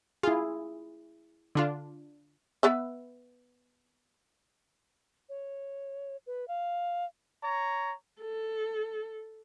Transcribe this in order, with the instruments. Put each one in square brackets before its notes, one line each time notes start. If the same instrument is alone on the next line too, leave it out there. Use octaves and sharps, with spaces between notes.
[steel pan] E4 G#4 [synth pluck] F4
[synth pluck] D3 D4 F4
[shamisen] B3 B4 E5
[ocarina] C#5
B4
F5
[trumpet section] C#5 A#5
[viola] A4